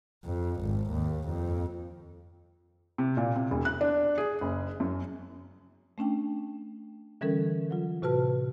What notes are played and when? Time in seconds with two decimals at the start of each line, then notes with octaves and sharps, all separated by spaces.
0.25 F2
0.62 G#1
0.91 D#2
1.29 F2
2.98 C3
3.17 A#2
3.36 C3
3.51 E1
3.65 F#6
3.81 D4
4.18 G#4
4.41 F#1
4.80 F#2
5.98 A3 C#4 D4 G5
7.21 D3 E3 G3 C#4 A4 A#4
7.71 F#3 F4
8.02 A2 C3 F#4 B4 A5 F6